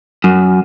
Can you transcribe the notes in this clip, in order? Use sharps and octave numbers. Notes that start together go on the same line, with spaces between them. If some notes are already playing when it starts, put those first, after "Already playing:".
F#2